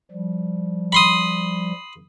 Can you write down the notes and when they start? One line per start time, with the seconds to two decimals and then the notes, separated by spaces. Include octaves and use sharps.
0.11 F3 G3
0.92 B5 C6 D#6